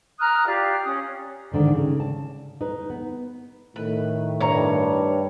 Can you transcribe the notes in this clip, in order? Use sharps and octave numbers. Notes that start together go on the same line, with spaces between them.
A#5 D#6 F6 F#6
F4 G4 D5
C#4 D#6
D2 G#2 D3 D#3
C#3
A5
D#4 B4
B3
A2 D#3 B4
G2 C#5 A#5